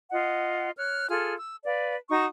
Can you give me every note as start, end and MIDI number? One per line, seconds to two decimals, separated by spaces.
0.12 0.69 65
0.12 0.69 75
0.12 0.69 78
0.77 1.06 73
0.77 1.06 89
0.77 1.06 90
1.09 1.34 65
1.09 1.34 68
1.09 1.34 69
1.09 1.34 89
1.37 1.55 88
1.65 1.95 71
1.65 1.95 74
1.65 1.95 77
2.09 2.25 63
2.09 2.25 66
2.09 2.25 85
2.09 2.25 87